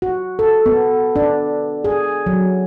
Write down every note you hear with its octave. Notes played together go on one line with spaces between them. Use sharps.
F#4
A4
B3
D4
G#4
F#3